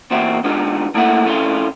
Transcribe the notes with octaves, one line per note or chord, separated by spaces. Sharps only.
E2 A#2 C4 F#4 E5
G#3 B3 D4 D#4 F4 G4
A3 A#3 E4 A4 E5 F#5
F2 A2 A3 C#4 E4 F4